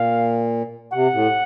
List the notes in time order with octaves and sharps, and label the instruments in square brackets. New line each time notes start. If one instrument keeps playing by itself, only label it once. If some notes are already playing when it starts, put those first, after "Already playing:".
Already playing: [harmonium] A#2 [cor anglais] F5
[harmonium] C3 [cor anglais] F#5
[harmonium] A2